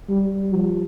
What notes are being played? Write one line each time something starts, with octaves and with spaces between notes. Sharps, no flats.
G3
F3